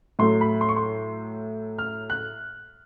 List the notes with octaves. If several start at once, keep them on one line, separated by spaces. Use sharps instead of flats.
A2 F#3 A3 C6
B5
C6
C#6
C6
F6
F#6